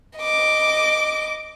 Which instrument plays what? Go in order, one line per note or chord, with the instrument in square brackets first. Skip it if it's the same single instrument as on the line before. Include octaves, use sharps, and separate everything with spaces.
[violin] D#5 D6